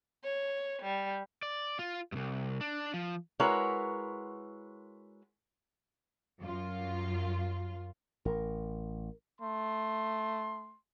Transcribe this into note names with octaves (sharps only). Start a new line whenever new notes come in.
C#5
G3
D5
F4
C2 G2
D4
F3
G#3 E4 F#4 A#4 B4 C#5
F#2 F4
A1 A#4
A3 C6